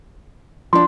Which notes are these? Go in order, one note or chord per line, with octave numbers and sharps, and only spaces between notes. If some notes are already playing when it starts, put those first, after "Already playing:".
F3 D4 C6